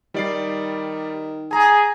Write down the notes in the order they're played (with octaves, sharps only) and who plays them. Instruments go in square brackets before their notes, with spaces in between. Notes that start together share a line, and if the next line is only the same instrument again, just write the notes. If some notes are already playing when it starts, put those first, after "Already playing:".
[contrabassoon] D#3 [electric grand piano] G3 D5 C7
[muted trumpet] G#4 [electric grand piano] G#5 A#5